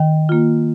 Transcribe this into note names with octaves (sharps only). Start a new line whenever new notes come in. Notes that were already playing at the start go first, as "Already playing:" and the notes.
Already playing: D#3 G5
A#3 F4